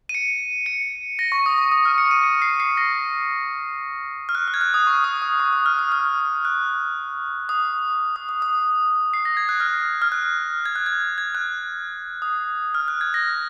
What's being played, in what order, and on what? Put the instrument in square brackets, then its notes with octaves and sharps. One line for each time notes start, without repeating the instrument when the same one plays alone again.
[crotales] D#7
C#7
C#7
A#6
C#6
D#6
C#6
D#6
F6
C#7
D#7
C#7
C7
C7
A#6
F6
F#6
F6
G#6
F#6
D#6
C#6
D#6
D#6
C#6
D#6
F6
D#6
F6
F#6
D#6
D#6
D#6
D#6
C7
A#6
G#6
F#6
F6
F6
F#6
G#6
F#6
G#6
G#6
F#6
D#6
F6
F#6
G#6
A#6